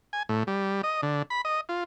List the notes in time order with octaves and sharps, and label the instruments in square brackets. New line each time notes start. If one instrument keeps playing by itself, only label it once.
[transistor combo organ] G#5
A2
G3
D#5
D3
B5
D#5
F4